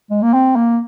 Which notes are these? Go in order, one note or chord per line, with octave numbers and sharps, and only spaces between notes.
G#3
A#3
C4
A#3